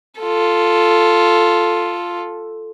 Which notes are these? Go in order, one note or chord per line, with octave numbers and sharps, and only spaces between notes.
F4 A4